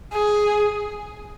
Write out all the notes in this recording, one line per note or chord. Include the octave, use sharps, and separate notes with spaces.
G#4